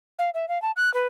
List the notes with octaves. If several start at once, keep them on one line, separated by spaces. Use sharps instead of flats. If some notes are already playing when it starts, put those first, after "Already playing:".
F5
E5
F5
A5
F#6
B4